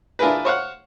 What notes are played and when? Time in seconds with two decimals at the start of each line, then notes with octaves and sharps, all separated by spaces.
0.19 D4 E4 F4 G#4 A#4 B4
0.45 C5 C#5 F5 F#5